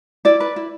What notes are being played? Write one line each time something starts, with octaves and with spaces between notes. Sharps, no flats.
E4 D5
B4
E4